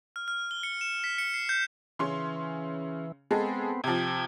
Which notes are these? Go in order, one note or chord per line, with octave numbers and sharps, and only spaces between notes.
F6
F6
G7
C#7
E7
B6
C#7
C7
G6
C#3 E3 C#4 C6
G#3 B3 C4 G#4 A4
C3 F3 G5 G#6